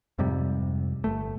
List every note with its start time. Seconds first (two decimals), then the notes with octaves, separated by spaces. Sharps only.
0.19 F2 G#2 C3 G3
1.04 G1 A3